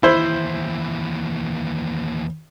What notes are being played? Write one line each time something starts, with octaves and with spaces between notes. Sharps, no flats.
D#2 E3 E4 C5